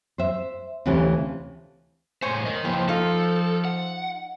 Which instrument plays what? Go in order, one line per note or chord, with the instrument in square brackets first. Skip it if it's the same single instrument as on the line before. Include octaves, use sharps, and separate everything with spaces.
[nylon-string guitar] C5 E5
D2 C3 E3 A3 C#4 F4
[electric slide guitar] A2 C5 [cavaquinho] C#5 G#5 C6
[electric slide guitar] A#4 D#5
[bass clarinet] F3 [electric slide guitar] A#3 B3 E4 [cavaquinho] G5
[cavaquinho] D#4 F4 [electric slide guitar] A4
[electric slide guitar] F#5